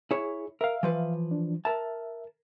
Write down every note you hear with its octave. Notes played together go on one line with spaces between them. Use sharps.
E4 G#4 C#5
A#4 E5 F5
E3 F3 B4
D4
A#4 E5 A5